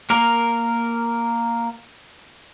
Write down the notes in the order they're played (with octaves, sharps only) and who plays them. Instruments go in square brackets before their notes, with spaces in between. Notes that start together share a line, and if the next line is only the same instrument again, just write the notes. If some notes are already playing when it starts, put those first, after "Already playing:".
[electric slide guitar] A#3 A#4